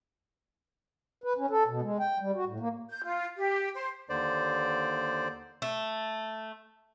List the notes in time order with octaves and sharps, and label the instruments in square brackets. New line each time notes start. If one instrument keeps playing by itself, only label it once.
[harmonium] B4
C#4
A4
B2
G#3
G5
G3
F#4
A2
A#3
[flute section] G6
F4
G4
C5
[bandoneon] D#2 D3 C5 D5
[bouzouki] A3